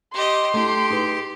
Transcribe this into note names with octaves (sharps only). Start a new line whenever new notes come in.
G4 D#5 C6
A3 D4 E4 G4
D#4 G#4 B4